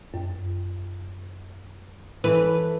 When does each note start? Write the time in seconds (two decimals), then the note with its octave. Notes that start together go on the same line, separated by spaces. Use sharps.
0.14 F#2
2.24 E3 A4 B4